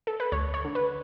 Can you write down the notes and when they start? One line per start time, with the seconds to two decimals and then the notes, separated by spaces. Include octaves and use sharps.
0.07 A4
0.20 B4
0.32 D2 C#5
0.54 C#5
0.65 D3
0.75 B4